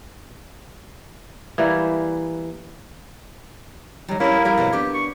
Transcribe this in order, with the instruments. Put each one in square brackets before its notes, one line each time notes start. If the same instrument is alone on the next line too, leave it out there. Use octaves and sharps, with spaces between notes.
[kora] E3 G3 A#3
[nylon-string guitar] D#3 G3 [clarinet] F#3
[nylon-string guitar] G3 C#4 [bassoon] A#3 [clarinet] E4
[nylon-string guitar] G3 A#4 F5 [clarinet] E4
[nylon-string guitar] B2 F#3 C4
[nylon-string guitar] B3 D4 [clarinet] G4
[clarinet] C#6